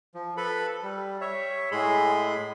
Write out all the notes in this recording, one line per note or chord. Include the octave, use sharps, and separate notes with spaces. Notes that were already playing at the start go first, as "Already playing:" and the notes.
F3
A4 B4 B5
G3
C#5 E5
A2 G#3 G#4 B5 C6